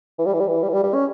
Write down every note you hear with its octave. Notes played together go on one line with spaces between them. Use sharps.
E3
G3
E3
G3
E3
G3
E3
G3
G3
C#4